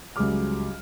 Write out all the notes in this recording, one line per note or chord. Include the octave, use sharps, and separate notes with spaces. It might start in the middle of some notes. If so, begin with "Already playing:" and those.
C#2 F#3 G3 G#4 D6 F6